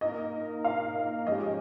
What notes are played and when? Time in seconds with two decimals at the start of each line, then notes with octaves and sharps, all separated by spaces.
0.01 A#3 D#4 A#4 D#5
0.64 F5
1.27 F3 G#3 C#4 G4 D#5